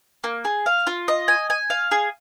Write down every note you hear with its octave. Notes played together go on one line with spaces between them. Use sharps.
A#3
G#4
F5
F4
D#5
G#5
G#5
F5
G#4